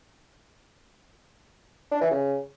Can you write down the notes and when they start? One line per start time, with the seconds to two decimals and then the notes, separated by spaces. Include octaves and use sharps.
1.91 D4
2.01 E3
2.11 C#3